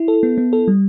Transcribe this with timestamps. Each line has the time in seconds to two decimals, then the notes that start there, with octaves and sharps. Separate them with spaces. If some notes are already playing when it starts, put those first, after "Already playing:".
Already playing: E4
0.08 A4
0.23 B3
0.38 B3
0.53 A4
0.68 G3